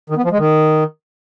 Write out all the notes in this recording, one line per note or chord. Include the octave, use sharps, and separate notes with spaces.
D#3
B3
F3
G#3
D#3